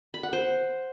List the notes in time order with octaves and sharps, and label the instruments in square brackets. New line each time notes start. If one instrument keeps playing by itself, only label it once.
[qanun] B5
F#5
C5